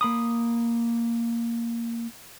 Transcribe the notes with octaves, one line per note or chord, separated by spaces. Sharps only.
A#3 B5 D#6